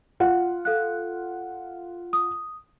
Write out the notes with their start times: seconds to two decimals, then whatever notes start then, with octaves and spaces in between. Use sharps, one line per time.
0.20 F4 F#5
0.65 A4 F5 F#6
2.13 D#6